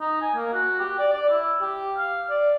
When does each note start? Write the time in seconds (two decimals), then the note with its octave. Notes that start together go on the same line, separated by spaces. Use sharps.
0.01 D#4
0.22 G#5
0.36 A#3
0.53 F#4
0.80 G4
0.99 D5
1.12 D5
1.30 E4
1.61 G4
1.97 F5
2.30 D5